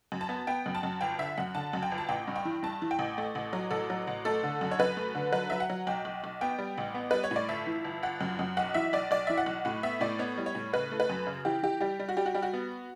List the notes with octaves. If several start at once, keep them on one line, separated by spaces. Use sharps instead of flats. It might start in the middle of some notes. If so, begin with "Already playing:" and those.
F#2
A5
B3
B3 G5
F#2
A5
F#2
G1 G5
D3 E5
F#2 F#5
D3 A5
F#2
G5
G1
A5
A1 G5
G2
G5
E3
G2 A5
E3
G5
A1
A3
A1
F#3
A1 A4
F#3
A1
A3 A4
D3
F#2
C#5
F#2 B4
A3
D3
F#3 B4
F#3 E5
F#5
F#3
B1 G5
B1
B1
B3 G5
G3
A1
B3
G3 B4
C#5
A2 D5
G1 E5
E3
G1
G1 F#5
F#2
F#2
B1 F#5
E3 E5
B1 D5
B1 D5
E3 E5
F#5
B1
A2 F#5
B3 E5
A2 D5
B3 C#5
G3
C#5
A2
C#3 B4
A3
B4
F#2
C#3
E3 G4
E3 G4
G3 G4
G3
F#4
G3 G4
F#4
G3 G4
F#4
B3